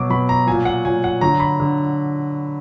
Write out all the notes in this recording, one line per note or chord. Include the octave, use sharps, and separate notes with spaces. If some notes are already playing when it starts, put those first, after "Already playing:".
Already playing: B2 F#3 D6
B2 F#3 B5
A#5
A#2 F#3 G#5
F#5
A#2 F#3 G#5
F#5
D3 F#3 A#5
B5
D3